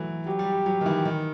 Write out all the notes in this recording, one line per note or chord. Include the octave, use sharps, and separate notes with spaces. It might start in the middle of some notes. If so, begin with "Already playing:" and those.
Already playing: E3 F#3 A3
F#3 G4
G3
G3
F#3
D#3
E3
D#3